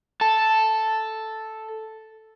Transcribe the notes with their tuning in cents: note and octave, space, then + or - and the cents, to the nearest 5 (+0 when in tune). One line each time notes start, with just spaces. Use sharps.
A4 +0 A5 +0